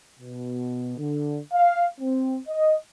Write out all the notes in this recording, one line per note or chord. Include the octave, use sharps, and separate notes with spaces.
B2
D3
F5
C4
D#5